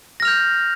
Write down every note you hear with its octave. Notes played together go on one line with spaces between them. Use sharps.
F6 G6 A#6 F7